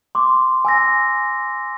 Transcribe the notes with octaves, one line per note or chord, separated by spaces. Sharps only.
C6 D6
G#5 E6 A#6